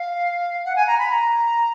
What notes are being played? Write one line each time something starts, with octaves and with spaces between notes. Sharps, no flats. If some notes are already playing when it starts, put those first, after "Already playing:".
Already playing: F5
F#5
G#5
A#5
B5
A#5